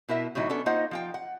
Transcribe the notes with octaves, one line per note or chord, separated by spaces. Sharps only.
B2 E4 A#4 E5
A2 D3 F#3 D#4 E4
B3 C#4 D4 A4
A#3 D#4 F4 C5 D#5 F#5
F3 F4 G5
F#5